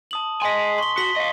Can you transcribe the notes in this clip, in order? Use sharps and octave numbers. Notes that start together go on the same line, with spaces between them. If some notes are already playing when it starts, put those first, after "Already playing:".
A5 D#6 F#7
D#5 G#5 C6 B6
C6 C#6 G7
F#4 B6 F#7 G7
D#5 F5